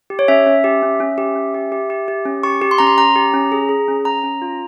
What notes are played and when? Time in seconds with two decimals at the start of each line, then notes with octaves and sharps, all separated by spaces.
0.10 G4
0.19 C#5
0.28 C#4 E5
0.46 C#4
0.64 G4
0.82 C#4
1.00 C#4
1.18 G4
1.35 C#4
1.54 G4
1.72 G4
1.90 G4
2.08 G4
2.25 C#4
2.43 G4 C#6
2.62 G4
2.71 C6
2.78 C#4 A#5
2.87 C6
2.97 C#4 A#5
3.16 G4
3.33 C#4
3.52 G#4
3.69 G#4
3.88 C#4
4.05 C#4 A#5
4.24 C#4
4.42 F4